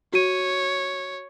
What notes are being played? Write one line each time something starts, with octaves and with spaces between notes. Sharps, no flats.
F#4 C#5 D#7